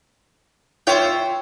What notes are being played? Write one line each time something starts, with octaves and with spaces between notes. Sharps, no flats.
F4 C5 C#5 E5 G5